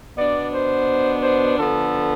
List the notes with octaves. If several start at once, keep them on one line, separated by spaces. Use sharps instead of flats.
B2 B3 D4 D5
C5
C5
D3 F3 B3 A4